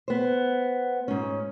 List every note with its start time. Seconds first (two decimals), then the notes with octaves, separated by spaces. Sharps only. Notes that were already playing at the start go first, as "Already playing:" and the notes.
0.08 B3 C5
1.08 G#2 C#4